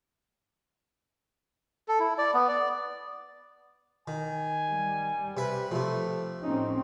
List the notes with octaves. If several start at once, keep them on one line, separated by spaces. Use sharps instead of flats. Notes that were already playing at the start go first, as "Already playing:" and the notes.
A4
E4
D5
B3
D5
D#3 G#5
G3
C3 B4 E5
C3 F3 A3
A2 C4 C#4 D#4